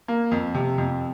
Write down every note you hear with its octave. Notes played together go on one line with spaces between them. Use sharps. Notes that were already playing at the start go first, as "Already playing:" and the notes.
A#3
F2
C3
F2